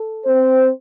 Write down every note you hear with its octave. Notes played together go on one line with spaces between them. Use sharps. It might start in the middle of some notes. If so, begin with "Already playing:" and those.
Already playing: A4
C4 C5